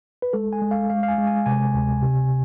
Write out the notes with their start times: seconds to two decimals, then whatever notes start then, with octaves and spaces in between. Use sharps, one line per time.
0.22 B4
0.33 G#3 A4
0.53 G#5
0.62 G#3
0.71 F5
0.90 G#3 F5
1.03 F5
1.08 G#5
1.18 G#3
1.27 G#5
1.46 C3 G#5
1.74 D2
2.02 C3